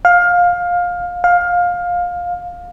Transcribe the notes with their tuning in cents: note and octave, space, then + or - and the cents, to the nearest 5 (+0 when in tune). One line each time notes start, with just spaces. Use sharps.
F5 +20
F5 +20